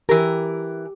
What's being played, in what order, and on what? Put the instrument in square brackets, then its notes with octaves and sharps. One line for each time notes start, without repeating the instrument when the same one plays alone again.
[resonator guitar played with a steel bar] E3 A#4 [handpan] G4